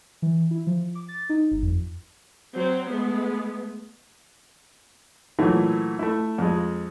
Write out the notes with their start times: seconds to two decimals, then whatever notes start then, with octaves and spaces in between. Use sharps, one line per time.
0.22 E3
0.51 E4
0.67 F3
0.95 D6
1.08 A6
1.29 D#4
1.51 G1
1.63 F2
2.53 F#3 C4
2.87 G#3 A3 B3
5.39 A#2 E3 F#3 A3
5.99 A3 E4
6.38 F2 G#3